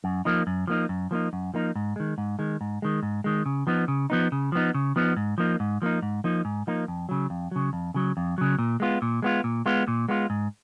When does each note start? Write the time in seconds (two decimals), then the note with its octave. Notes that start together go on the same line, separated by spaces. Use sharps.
0.04 F#2
0.25 F3 A#3 D#4
0.47 F#2
0.67 F3 A#3 D#4
0.89 F#2
1.11 F3 A#3 D#4
1.33 F#2
1.54 F3 A#3 D#4
1.75 G#2
1.96 D#3 G#3
2.18 G#2
2.39 D#3 G#3
2.61 G#2
2.82 D#3 G#3
3.03 G#2
3.24 D#3 G#3
3.46 C#3
3.67 F3 B3 D#4
3.88 C#3
4.10 F3 B3 D#4
4.32 C#3
4.52 F3 B3 D#4
4.74 C#3
4.96 F3 B3 D#4
5.17 G#2
5.38 F3 A#3 D#4
5.60 G#2
5.82 F3 A#3 D#4
6.02 G#2
6.24 F3 A#3 D#4
6.45 G#2
6.67 F3 A#3 D#4
6.88 F2
7.09 C#3 F#3
7.30 F2
7.51 C#3 F#3
7.73 F2
7.94 C#3 F#3
8.17 F2
8.38 C#3 F#3
8.59 A#2
8.80 G#3 B3 F4
9.02 A#2
9.22 G#3 B3 F4
9.44 A#2
9.66 G#3 B3 F4
9.88 A#2
10.09 G#3 B3 F4
10.30 G#2